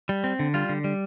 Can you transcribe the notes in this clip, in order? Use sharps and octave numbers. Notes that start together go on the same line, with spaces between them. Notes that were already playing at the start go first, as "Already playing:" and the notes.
G3
C4
D3
G3 F4
D3
G3